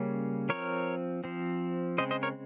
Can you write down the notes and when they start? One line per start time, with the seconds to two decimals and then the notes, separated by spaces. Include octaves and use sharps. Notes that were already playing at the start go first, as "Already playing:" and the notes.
Already playing: C#3 G3 A#3 C#4
0.49 F3 C4 A#4 C#5
1.24 F3 C4
1.98 C#3 G#3 C4 C5 D#5
2.11 C5 D#5
2.23 A#4 C#5